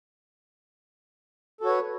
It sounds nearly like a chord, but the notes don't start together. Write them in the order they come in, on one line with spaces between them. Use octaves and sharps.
A4 F#4 C#5 B4